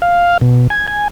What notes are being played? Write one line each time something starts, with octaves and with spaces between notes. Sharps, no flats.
F5
B2
G#5
G#5